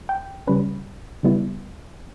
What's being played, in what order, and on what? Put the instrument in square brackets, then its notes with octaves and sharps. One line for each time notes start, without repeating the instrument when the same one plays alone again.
[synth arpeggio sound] G5
C#3 G3 C#4 B4
C#3 G3 B3 E4